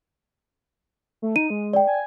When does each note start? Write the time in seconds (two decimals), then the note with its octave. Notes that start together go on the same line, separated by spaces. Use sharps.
1.22 A3
1.36 D#4 D#7
1.50 G#3
1.73 D5 G5
1.87 G#5